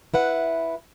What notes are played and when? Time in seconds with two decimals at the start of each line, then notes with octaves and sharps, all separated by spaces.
0.14 E4 B4 F#5